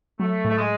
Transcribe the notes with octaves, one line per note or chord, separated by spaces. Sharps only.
F#3 A3
A2 A3
G#3